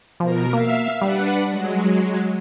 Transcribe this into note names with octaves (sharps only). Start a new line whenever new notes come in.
B2 F3 A#4
A#3 E5 F5
G3 D4 B4 F#5
F#3 G#3